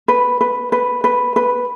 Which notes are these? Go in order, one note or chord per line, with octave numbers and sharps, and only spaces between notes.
B4
B4
B4
B4
B4